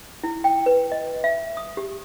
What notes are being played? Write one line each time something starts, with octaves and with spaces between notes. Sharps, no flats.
E4
G5
B4
D#5
E5
D#6
G4